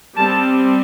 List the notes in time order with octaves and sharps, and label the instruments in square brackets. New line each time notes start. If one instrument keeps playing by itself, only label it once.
[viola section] G3 C4 A5